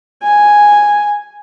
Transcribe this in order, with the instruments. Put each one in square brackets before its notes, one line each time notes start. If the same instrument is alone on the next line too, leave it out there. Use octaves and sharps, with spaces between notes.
[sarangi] G#5